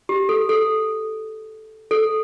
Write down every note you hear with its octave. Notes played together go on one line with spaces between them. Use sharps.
G4
A4
A4
A4